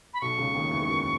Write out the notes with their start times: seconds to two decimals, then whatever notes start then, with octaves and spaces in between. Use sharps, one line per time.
0.14 B5
0.21 B1 B2 C#6
0.38 C#2 C#3
0.55 D#2 D#3
0.71 E2 E3
0.81 G#3
0.88 F#2 F#3